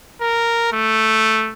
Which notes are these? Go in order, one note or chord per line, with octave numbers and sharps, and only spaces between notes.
A#4
A3